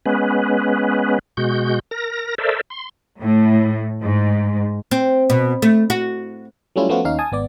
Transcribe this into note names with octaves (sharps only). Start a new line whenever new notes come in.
G#3 B3 C#4 B4
B2 G#3 F#4 G6
A#4 A#6
A4 A#4 C5 D5 E5
C6
A2
G#2
C4
B2
A3
F#4
F#3 G3 A3 C#4 E4 F4
F3 A3 B3 C#4 F4 F#4
D#2 C#4 D#4 F5
G#5 A5 D#6
G#1 B3 D5